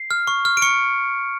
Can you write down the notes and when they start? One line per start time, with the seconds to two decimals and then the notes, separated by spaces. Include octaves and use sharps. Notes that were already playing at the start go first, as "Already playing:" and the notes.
Already playing: C7
0.11 F6
0.27 C#6
0.45 F6
0.57 D7
0.62 C#6 C#7